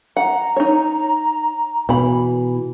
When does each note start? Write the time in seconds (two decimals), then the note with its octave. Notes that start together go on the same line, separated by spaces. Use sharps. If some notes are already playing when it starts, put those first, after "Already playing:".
0.17 F#5 A#5
0.56 D#4 C#5
1.89 B2 E3 B5